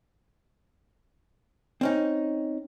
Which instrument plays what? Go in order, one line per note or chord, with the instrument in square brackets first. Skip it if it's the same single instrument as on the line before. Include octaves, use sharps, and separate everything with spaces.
[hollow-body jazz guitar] C4 C#4 D#4